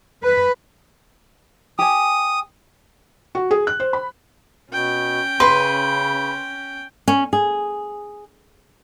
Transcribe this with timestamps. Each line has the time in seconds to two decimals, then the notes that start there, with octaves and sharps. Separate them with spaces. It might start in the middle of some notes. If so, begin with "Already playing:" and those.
0.22 B4
1.79 G4 G#5 D#6
3.35 F#4
3.51 G#4
3.67 F#6
3.80 C5
3.93 B5
4.71 B2 C#4 G5
5.40 C#3 B4 C6
7.08 C#4
7.33 G#4